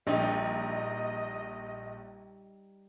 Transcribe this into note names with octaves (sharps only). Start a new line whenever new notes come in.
A#1 G3 D#4 D#5